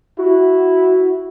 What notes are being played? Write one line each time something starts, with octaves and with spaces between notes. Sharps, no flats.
E4 F#4